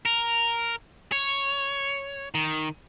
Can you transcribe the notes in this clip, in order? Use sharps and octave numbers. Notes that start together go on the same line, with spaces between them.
A#4
C#5
D#3